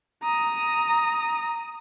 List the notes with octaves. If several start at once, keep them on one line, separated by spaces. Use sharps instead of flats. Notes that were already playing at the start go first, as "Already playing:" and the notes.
A#5 D#6